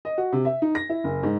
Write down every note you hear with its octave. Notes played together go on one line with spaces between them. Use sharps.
D#5
F#4
C3
E5
D#4
A#6
E4
F#1
G#2